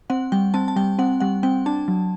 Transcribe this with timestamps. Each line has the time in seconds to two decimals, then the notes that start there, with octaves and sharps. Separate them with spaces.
0.10 C4 F#5
0.32 G3 G5
0.54 C4 A5
0.68 A5
0.76 G3 G5
0.99 C4 F#5
1.20 G3 F#5
1.43 C4 G5
1.66 D4 A5
1.88 F#3